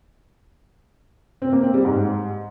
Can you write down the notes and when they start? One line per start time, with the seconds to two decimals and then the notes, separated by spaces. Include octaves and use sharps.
1.42 C4
1.52 A#3
1.63 C4
1.74 G3
1.85 G#2